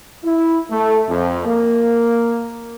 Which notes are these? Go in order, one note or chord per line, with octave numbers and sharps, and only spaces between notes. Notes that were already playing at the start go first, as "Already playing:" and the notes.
E4
A3
F2
A#3